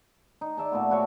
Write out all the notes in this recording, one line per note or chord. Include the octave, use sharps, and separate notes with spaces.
D#4
D5 E5 A5
A#2 A3 B3
E4 F#4 C#5 D5